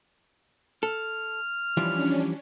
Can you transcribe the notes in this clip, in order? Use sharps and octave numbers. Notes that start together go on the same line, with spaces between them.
A4 F6
E3 F3 G3 C#4 D4